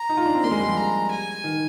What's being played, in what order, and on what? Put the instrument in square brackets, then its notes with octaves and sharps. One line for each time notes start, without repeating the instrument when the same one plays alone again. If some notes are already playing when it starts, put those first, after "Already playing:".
Already playing: [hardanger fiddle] A#5
[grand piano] D#4
F4
D4
C4
[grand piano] A#3 [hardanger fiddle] C6
[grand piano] G#3
G3
F3
[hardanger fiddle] A#5
G#5
[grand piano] D#3